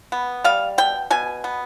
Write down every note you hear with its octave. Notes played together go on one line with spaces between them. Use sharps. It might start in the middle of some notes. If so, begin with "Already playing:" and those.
B3
G3 F5
B2 G5
B2 G#5
B3